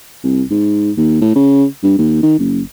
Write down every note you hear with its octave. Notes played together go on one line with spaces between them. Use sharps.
C2
G#2
D#2
A2
C#3
G2
D#2
D#3
F#1